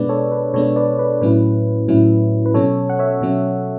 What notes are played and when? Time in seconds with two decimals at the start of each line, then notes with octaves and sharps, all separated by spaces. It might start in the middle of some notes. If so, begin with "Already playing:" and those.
Already playing: B2 G#3 B3 D4 B4 D5
0.09 A4 C#5
0.32 B4
0.54 B2 G#3 B3 D4 A4 C#5
0.76 B4 D5
0.99 B4
1.21 A2 F#3 C#4 E4 B4
1.88 A2 F#3 C#4 E4
2.46 B4
2.54 B2 F#3 C#4 A4 C#5
2.89 F#5
2.99 C#5 E5
3.21 B2 F#3 C#4